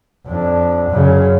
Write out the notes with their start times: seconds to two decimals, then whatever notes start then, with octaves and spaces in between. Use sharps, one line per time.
0.27 F2 D4
0.90 F#2 C#3